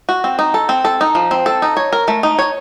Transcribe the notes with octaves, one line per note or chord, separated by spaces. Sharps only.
F#4
C4
D#4
A4
C4
A4
D#4
F3
C4
A4
D#4
C#5
A#4
A3
D#4
C#5